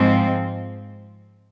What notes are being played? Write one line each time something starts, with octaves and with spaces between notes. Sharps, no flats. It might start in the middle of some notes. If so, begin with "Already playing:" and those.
Already playing: G#2 F3 G#3 C4